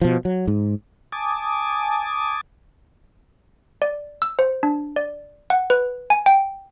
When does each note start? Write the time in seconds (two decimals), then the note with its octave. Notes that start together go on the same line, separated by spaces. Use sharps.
0.01 B2 F3
0.25 F#3
0.47 G#2
1.12 G#5 A5 D6 D#6
3.82 D5
4.22 E6
4.39 C5
4.63 D4
4.96 D5
5.50 F#5
5.70 B4
6.10 G#5
6.26 G5